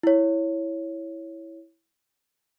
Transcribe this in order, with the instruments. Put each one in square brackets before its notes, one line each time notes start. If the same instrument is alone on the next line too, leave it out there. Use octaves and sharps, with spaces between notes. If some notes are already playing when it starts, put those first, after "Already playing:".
[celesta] E4 C#5